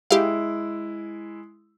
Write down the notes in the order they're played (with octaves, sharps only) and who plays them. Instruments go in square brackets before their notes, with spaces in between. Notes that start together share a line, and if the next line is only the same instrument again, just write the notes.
[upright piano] G#3 E4 [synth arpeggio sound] G4 F5